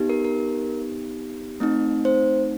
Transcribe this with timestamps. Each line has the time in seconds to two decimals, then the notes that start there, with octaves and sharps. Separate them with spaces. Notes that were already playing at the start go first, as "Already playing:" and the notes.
Already playing: B3 D#4 G4
0.09 A#4
0.24 A#4
1.60 A3 C4 D#4
2.05 C5